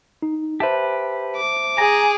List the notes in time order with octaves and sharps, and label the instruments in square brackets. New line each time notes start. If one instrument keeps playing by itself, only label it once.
[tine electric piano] D#4
[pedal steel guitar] G4 B4 [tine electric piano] C5 E5 A5
[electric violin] D6
[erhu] G#4 [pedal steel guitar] A#5